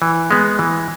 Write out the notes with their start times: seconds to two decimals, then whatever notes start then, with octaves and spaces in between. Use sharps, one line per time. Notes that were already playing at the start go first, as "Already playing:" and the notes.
0.02 E3
0.31 G#3 B3
0.59 E3